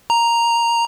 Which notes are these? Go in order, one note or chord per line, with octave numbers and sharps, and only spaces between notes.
A#5